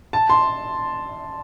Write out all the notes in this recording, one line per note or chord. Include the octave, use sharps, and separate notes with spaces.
A5
C6